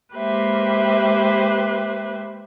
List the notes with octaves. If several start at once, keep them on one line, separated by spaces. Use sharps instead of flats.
G#3 A#3 G4 B4 C5 E5